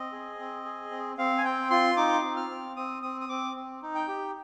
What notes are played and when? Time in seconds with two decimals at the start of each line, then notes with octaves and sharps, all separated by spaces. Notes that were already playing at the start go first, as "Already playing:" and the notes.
Already playing: C4 D#5
0.12 G#4
0.39 C4
0.65 G#4
0.91 C4
1.17 C4 F5
1.38 G#5
1.44 C4 G5
1.71 F4 C6
1.97 D#4 D6
2.23 C4
2.37 F6
2.50 C4
2.76 C4 D#6
3.02 C4 D#6
3.21 D#6
3.29 C4 D6
3.55 C4
3.83 D#4
3.95 G5
4.08 G4